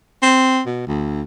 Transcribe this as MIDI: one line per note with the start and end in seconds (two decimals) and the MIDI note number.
0.23 0.61 60
0.67 0.86 47
0.87 1.23 38